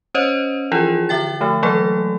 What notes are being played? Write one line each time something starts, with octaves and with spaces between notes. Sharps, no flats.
C#4 C5 C#5 D#5
E3 F3 E4 F4 G#4
D3 E5 G5 A6
D3 F3 A3
E3 F#3 G3 A3 A#3 A4